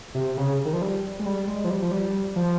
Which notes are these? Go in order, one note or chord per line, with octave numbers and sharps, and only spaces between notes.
C3
C#3
D#3
F3
G3
G#3
G3
G#3
F3
G3
F3
G3
F3